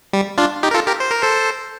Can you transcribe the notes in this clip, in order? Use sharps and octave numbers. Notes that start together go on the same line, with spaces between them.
G3
D4 F4
D#4 G4
A#4
F4 A4
G4 A#4
C5
A#4
A4 C5